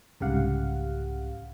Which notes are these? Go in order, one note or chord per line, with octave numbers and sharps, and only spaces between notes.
C2 G#2 C#3 G4 F5 F#5